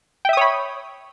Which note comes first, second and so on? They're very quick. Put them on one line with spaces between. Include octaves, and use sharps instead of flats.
G5 E5 D#6 C#5 B5